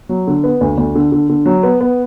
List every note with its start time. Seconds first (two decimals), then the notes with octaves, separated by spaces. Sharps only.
0.09 F#3
0.27 D3
0.44 B3
0.61 D2
0.78 D2
0.95 D3
1.12 D3
1.29 D3
1.46 F#3
1.63 B3
1.81 B3